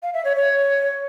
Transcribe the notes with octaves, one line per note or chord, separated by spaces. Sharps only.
F5
E5
C#5
C#5